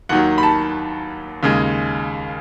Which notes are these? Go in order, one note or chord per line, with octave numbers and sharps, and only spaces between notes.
D#2 D#3 F#3 F#5
B5
A5
D#2 C#3 G#3